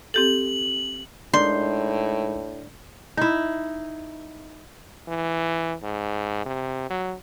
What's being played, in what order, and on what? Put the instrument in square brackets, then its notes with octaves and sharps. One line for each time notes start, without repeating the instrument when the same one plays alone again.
[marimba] C4 G4 A4 [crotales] F#7
[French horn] A2 [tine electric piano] G#3 D#4 A#4 [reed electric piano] D4 D5 G6 [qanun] C6
[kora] D#4 E4
[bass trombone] E3
G#2
C3
F#3